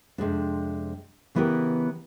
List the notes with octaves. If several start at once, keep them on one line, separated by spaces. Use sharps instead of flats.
F2 C3 G#3 D4
C#3 E3 B3 E4 G4 A#4